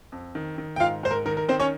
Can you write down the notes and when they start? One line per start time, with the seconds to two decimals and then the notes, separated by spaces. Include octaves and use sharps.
0.12 F2
0.35 D#3
0.58 D#3
0.76 G5
0.80 G#2 F4 F5
1.03 G#2 C5
1.11 A#4
1.25 D#3 A#4
1.37 A#4
1.48 D#3 C4 C5
1.60 C#4 C#5